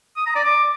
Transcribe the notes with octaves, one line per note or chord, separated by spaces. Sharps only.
D#6
A#5
D5
D6